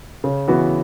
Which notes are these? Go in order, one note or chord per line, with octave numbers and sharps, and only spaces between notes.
C#3
E3 B3 F#4